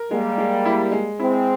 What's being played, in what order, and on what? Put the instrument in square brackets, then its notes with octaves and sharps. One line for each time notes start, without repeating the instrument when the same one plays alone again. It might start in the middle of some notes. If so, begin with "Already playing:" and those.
Already playing: [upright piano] A#4
[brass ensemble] G3 A#3 [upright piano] G#3
[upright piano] G#3
E4
G#3
[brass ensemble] G#3 C4 [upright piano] E4